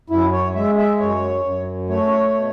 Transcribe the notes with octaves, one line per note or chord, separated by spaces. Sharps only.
F#2 E4
C#5
G#3 E5
E5
F#2 C#5
F#2
A3 C#5
B2